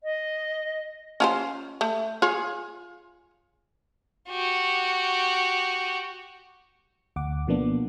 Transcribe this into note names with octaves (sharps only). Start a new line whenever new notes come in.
D#5
C#4 F4 C5
A3
F4 G#4 C#5
F#4 G4
D2 F#5 D6
B2 F3 A#3 B3 D4